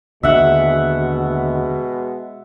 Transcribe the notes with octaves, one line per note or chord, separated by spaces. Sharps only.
D#2 B2 D3 G#3 E5 F#5